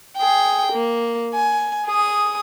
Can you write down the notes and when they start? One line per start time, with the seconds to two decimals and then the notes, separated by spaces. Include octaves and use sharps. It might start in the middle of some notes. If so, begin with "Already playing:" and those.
0.17 G#4 G5
0.73 A#3
1.34 G#5
1.87 G#4 D#6